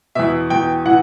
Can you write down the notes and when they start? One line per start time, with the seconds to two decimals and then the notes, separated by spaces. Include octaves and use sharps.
0.15 E2 B2 E5
0.50 E2 B2 G5
0.85 A2 E3 F#5